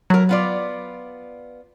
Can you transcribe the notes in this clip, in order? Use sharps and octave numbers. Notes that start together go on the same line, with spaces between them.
F#3 A3 A#4
B3 F4 D5